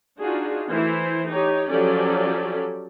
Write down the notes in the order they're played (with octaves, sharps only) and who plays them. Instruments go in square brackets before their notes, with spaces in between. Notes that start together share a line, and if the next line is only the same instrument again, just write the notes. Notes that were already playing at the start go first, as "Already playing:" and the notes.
[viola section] D4 D#4 F4 F#4 G#4
E3 A3 E4 C5
D#4 G4 C#5
F3 F#3 C#4 G4 A4 D5